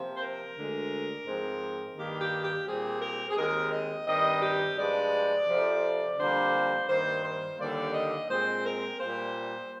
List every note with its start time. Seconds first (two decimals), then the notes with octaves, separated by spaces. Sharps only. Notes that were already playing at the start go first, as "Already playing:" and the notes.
Already playing: C3 F3 A#3
0.15 C5
0.20 A#4
0.55 D2 D3 G#3
1.26 G#2 F3 C4
1.96 G2 D#3 A#3 G4
2.20 G4
2.42 G4
2.66 A#2 G3 C4 G#4
3.01 A#4
3.30 G#4
3.36 D#2 D#3 G#3 C4 A#4
3.71 D#5
4.06 G2 D#3 G3 C4 D#5
4.42 G4
4.77 G2 F3 G#3 D5
5.48 F2 C3 F3
6.18 F2 D3 G3 A#3 C5
6.88 G2 D#3 A#3 C5
7.23 C5
7.58 D#2 D3 G3 A#3 D5
7.93 D#5
8.28 A#2 G#3 C4 C5
8.64 A#4
8.99 A#2 G3 A#3 C5